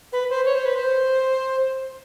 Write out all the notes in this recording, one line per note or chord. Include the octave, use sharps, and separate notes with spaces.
B4
C5
C#5
C5
B4
C5